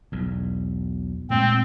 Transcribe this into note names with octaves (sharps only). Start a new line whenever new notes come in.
B1 E2
A#2 G#3 A3 C4